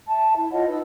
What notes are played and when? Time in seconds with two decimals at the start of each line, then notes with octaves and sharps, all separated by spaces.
0.08 E5 A5
0.35 E4
0.51 F4 C#5 D#5 F#5
0.68 D#4 B4 E6